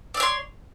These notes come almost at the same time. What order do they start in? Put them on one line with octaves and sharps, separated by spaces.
D5 E6 C#5 C6